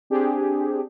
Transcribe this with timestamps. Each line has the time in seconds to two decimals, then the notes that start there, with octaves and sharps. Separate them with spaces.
0.10 C4 D4 G4 G#4